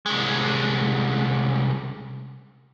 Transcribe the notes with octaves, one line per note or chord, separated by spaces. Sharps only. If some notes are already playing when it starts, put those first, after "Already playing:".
C2 G#3